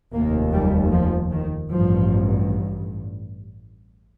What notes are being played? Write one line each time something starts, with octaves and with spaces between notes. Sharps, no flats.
F1 D#2 A#3
G3
F3
D#3
A1 G2 F3